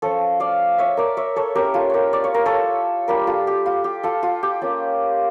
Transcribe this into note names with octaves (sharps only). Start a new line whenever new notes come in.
F3 C#4 F4 A4 C#5
D5 F5
C#5 E5
A#4 D5
C#5 E5
A4 C#5
A#3 C#4 E4 G4 A#4
F4 A4
G4 A#4 C#5
D5
C#5
A#4
A4 C#5
G3 D4 F4 G4 A#4
F4 A4
G4
F4
G4
F4 A4
F4
G4
A#3 C#4 F4